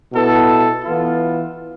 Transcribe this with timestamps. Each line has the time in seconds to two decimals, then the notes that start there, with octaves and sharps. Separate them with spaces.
0.12 B2 B3 E4 A4
0.85 E3 B3 F4